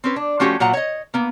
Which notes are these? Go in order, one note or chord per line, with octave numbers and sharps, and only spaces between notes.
C4 C#4 B4
D4
F3 A3 C#4 F#4 G4
A#2 F#3 F#5 A#5
C#5 D#5
A#3 B3